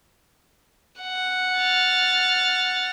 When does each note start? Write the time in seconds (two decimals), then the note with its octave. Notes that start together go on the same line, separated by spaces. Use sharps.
1.00 F#5
1.58 F6 A6